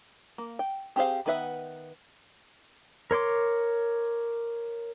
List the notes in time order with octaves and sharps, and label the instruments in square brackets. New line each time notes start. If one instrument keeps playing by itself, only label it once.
[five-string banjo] A#3
G5
C4 G4 G#4 C5 F5
D#3 B3 B4 E5 F#5
[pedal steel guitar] A#4 C#5 C6 D6